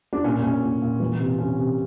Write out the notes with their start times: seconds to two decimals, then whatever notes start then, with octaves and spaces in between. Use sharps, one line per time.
0.13 D4
0.24 A#2 C#4
0.43 A#2 C#4
0.63 A#2
0.82 A#2
1.00 E3
1.19 C3
1.38 C3 C#4
1.58 C3